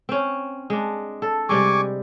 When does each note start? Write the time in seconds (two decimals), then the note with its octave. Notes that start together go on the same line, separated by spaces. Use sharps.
0.09 C4 C#4
0.70 G#3 D4
1.22 A4
1.49 C3 G3 G#3 G#5 C#6 D6